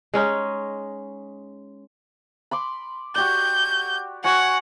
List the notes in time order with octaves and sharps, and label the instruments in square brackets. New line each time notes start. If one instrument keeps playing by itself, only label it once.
[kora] G#3 C#4 D#4
[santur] B5 C6 D6
[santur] F#4 G4 D5 [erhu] G6
[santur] F#4 C#5 G#5 [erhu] F#5